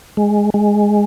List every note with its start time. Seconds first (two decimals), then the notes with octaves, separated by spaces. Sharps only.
0.17 G#3
0.54 G#3